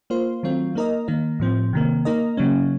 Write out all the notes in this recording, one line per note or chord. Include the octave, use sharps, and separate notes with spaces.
A#3 F4 C5
D#3 F#3 A3 C4 F4
A#3 D#4 A#4 D#5
D#3 A#3 D#4
A2 F3 C4
C3 D#3 A#3
A#3 D#4 A#4 D#5
C#3 F#3 A#3 C#4